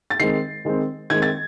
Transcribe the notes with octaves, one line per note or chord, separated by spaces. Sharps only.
A6
D#3 G#3 C4 C7
D#3 G#3 C4
D#3 G#3 C4 G#6
A6